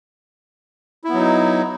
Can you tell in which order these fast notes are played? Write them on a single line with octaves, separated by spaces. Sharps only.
E4 B3 F#3 D#4